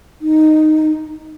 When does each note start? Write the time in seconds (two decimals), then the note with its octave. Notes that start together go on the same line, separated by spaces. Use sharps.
0.21 D#4